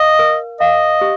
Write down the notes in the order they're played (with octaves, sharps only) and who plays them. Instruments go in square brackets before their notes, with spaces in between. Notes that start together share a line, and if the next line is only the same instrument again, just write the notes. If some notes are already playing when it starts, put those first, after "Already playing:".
Already playing: [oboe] D#5 [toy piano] F5
[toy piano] A#4
[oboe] D#5 [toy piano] F5
[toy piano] G4